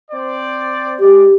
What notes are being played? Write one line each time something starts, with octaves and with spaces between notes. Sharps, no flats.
C4 C5 D5
G#3 G4 D5